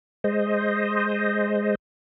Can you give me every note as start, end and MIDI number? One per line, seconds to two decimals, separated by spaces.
0.24 1.75 56
0.24 1.75 72
0.24 1.75 75